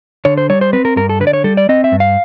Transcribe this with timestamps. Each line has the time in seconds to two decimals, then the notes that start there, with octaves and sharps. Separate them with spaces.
0.25 D3 C#5
0.38 C5
0.50 G3 C#5
0.61 C5
0.73 C4 B4
0.85 A#4
0.96 G2 A#4
1.09 A4
1.20 D3 B4
1.27 D5
1.33 C#5
1.44 G3 A4
1.57 D5
1.69 C4 D#5
1.84 E5
1.92 G2
2.00 F5